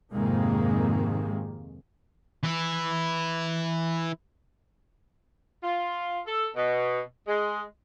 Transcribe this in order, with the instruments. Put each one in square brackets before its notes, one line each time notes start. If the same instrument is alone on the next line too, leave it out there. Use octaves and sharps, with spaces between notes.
[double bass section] F2 G#2 C3 D#3 G#3 A#3
[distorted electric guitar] E3 E4
[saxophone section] F4
A4
B2
G#3